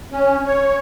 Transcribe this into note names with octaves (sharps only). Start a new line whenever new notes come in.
C#4
C#5